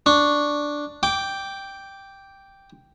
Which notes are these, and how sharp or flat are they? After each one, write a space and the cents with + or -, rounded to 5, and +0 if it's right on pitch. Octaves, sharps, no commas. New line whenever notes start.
D4 +0 C#6 +0
G5 +0 D6 -10